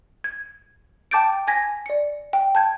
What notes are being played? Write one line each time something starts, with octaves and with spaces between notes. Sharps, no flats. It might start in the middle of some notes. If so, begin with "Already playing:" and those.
G#6
G5 A5 D6 G6 A6 D7
G#5 G#6 A#6 B6
D5 C#7
G5
A5 G6 G#6